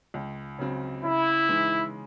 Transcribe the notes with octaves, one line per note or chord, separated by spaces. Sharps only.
C#2
C#3 F#3 C4
C#3 E4
E3 G#3 D#4